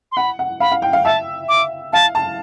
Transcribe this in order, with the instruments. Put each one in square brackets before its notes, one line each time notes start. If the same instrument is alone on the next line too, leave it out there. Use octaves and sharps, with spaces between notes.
[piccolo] C6
[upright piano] F#5 [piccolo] B5
[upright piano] F#5
[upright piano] F5 [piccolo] B5
[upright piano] F5
G5
F5
[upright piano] E5 [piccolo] A5
[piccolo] D6
[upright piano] F5 [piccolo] A5
[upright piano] A5